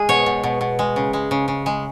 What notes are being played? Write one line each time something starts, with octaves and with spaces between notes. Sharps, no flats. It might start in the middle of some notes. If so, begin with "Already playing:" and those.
Already playing: G#3 G#4
B2 C#5
B2
B2
B2
G#3
C#3
G#3
C#3
C#3
G#3